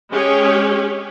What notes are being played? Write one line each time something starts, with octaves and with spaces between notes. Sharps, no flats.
G#3 C#4 G4 G#4 C#5